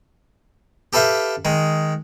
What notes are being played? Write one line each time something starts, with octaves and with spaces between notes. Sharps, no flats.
G4 A4 B4 E5 F5 G5
D#3 G#3